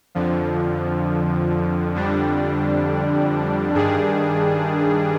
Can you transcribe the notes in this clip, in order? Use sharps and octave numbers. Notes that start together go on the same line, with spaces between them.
F2 D3 F3
F2 D3 G3 D4
G2 D#3 G3 D4 G#4